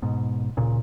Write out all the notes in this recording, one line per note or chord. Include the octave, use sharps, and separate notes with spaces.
G#2 B2
D1 A#2 C#3